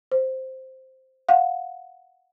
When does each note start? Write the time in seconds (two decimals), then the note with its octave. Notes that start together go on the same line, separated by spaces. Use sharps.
0.12 C5
1.29 F5 F#5